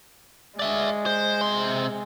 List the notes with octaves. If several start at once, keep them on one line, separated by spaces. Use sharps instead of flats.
G#3 D5 E5
C5
C3 C6